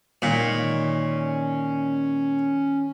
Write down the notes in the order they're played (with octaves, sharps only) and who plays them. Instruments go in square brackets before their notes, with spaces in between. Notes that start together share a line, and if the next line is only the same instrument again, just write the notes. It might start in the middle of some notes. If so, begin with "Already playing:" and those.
[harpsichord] A#2 [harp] D#3 G#3 [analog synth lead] C#4